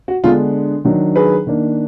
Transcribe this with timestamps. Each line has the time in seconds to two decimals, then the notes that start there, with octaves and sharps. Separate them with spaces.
0.08 F#4
0.24 D3 G#3 B3 D4 F4
0.85 D#3 F#3 D4
1.16 G#4 B4
1.47 D#3 A#3 D4